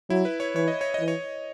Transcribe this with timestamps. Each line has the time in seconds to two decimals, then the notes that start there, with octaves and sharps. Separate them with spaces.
0.10 F#3 E4
0.25 B4
0.40 C#5
0.55 E3 C#5
0.68 D#5
0.81 C#5
0.94 D#5
1.00 E3
1.08 C#5